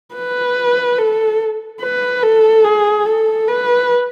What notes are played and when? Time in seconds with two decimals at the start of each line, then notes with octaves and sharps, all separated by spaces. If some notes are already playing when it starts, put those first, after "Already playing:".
0.15 B4
0.98 A4
1.81 B4
2.23 A4
2.65 G#4
3.05 A4
3.48 B4